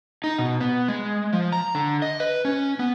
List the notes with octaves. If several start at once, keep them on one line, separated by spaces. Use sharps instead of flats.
D#4
B2
B3
G#3
F3
A#5
D3
D#5
B4
C#4
B3